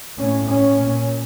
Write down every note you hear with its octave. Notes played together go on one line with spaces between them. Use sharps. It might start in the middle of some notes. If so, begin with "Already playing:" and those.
A2 C#4
C#4
A#2